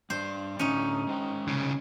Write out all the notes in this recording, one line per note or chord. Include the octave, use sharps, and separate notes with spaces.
G3 D4 C5 D5
A2 D3 C#4 D#4
G#3 C5 G5
C2 C#3